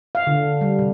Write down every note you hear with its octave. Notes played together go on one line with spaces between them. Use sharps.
F5
D3
G3
C3